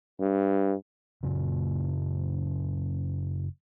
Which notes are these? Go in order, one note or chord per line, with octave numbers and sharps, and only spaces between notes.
G2
F#1 F#2 A#2 C#3